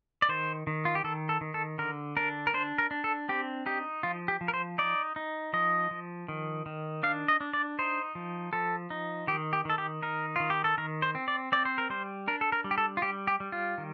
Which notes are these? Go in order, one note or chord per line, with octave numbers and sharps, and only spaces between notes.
D5
D#3 C5
D#3
F4
G4
D#3 A4
A4
D#3
A4
D3 A#4
D4 A#4
A#4
D4 C5
A#4
D4
A4
C4 G4
D#4 G4
F3 F4
G4
F3
A#4
C5
D#4 D5
D#4
F3 D#5
F3
D#3
D#3
D4 F5
D#5
D4
D5
D#4 C5
F3
F3 A4
D#4
D#3 G4
G4
D#3 A4
G4
D#4 A#4
D#3 F4
G4
A4
D#3 A#4
C5
C4
D5
C4 D5
C5
A#4
G3 C5
D4 A#4
A4
A#4
G3
G4
A4
F4
G3 G4
G4
G3
F4
D#3